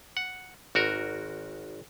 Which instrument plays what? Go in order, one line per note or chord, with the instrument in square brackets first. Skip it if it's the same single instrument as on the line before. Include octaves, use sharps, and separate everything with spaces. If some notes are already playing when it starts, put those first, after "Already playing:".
[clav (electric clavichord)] F#5
G#1 F#4 A#4